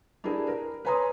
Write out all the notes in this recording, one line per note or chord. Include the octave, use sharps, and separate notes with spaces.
D4 E4 G4 G#4 A#4
A#4
B4 C#5 G#5 A#5 C6 D#6